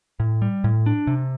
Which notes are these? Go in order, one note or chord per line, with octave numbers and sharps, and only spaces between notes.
A2
G3
A2
D4
C3